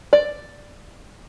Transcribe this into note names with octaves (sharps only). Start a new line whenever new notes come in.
D5